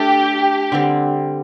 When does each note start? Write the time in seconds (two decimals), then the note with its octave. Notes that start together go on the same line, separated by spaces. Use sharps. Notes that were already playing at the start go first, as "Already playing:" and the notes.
Already playing: A3 D4 G4 A4
0.72 D3 G3 C4